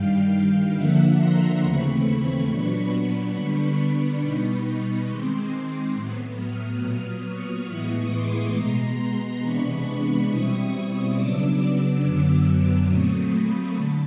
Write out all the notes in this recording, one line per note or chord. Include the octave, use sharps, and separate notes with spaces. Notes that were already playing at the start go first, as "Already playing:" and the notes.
Already playing: G2 D#3 G3 F5 G5
D3 F3 A#3 D4 E5 F#5
A#5 C6
D#2 C#3 E3 A3 C4 B5 C#6
A#2 F#3 B3 D4
D3 G3 B3 D4 B5 C#6
B2 G3 B3 D#4
D#3 G#3 C4 C6 D6
C6 D6
A2 F#3 B3
D#6 F6
A#2 F#3 B3 D#6 F6
C#6 D#6
A2 E3 G#3 B3 E4 C#6 D#6
C6 D6
B2 G#3 B3 A#5 C6
C3 E3 G#3 B3 D4 B5 C#6
B5 C#6
B2 G3 C4 E4 C#6 D#6
C#6 D#6
C#3 F#3 B3 D4 D6 E6
D6 E6
F#2 D3 F#3 B3 D6 E6
A#2 F#3 A3 C4 C#6 D#6
B5 C#6
D3 A5 B5